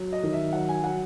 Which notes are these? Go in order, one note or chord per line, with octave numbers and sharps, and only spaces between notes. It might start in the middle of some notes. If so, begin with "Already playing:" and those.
Already playing: F#3
D#5
D#3
E5
F#3 F#5
G#5
F#3 F#5